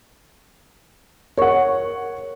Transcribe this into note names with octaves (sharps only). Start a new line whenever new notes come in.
A#4 C#5 F#5 C#6